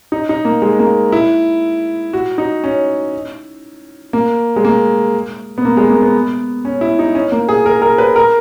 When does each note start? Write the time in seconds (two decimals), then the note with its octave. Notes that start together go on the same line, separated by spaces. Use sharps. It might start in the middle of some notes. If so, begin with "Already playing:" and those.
0.12 D#4
0.29 D#4
0.45 A#3
0.62 G#3
0.79 A#3
1.12 E4
2.13 F#4
2.38 D#4
2.64 C#4
4.13 A#3
4.56 G#3
4.65 A#3
5.58 B3
5.65 A#3
5.77 G#3
5.90 A#3
6.02 B3
6.65 C#4
6.81 E4
6.99 D#4
7.15 C#4
7.32 A#3
7.49 G#4
7.66 A#4
7.82 A#4
7.98 B4
8.16 A#4